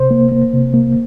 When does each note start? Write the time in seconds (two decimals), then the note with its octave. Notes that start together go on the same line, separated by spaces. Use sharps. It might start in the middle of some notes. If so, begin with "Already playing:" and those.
Already playing: C3 C5
0.11 A#3
0.32 A#3
0.53 C3
0.74 A#3